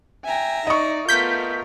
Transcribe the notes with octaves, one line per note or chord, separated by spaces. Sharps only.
E5 G5 G#5 A#5
D#4 D5 D#5 C#6
A3 B3 F4 A#4 G6 B6